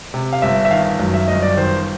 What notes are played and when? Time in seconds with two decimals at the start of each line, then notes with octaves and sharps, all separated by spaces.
0.14 C3
0.33 F5
0.42 G1 E5
0.65 E5
0.71 D#3 F5
0.99 F#2
1.14 E5
1.28 G1 D#5
1.42 D5
1.57 D#3 C5